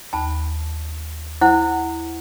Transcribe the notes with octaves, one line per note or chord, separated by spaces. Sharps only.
D#2 A5 B5
E4 C5 F#5